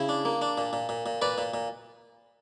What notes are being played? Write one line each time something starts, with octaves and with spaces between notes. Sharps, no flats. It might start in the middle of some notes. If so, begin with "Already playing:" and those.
Already playing: C#3 E4
D4
A#3
D4
A#2
A#2
A#2
A#2
A#2 B4 D5
A#2
A#2